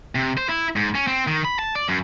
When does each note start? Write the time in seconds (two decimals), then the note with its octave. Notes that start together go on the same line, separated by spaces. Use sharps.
0.15 C3
0.37 C5
0.49 E4
0.76 G#2
0.95 C#4
1.07 C4
1.27 D#3
1.45 B5
1.59 A5
1.75 D5
1.89 F#2